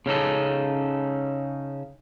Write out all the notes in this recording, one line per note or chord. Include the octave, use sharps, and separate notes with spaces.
C#3 C#4 D#4 A4